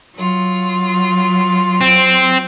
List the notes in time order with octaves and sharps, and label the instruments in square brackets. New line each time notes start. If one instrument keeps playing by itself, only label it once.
[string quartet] F#3 F4
[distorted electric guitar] C4